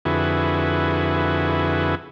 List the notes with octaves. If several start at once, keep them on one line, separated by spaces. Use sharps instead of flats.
F2 D3 E4 F#4 G#4 B4